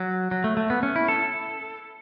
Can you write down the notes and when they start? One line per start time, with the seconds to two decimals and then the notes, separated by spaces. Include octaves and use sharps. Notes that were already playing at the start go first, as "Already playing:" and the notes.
Already playing: F#3
0.31 F#3
0.44 A3
0.57 A3
0.70 B3
0.83 C#4
0.96 E4
1.08 A4